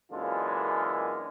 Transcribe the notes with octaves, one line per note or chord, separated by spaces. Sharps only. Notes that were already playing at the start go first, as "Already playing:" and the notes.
F#2 A#2 D3 E3 G#3 F4